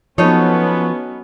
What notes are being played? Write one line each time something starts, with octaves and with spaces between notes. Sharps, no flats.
F3 F#3 B3 C#4 D#4 A4 C#5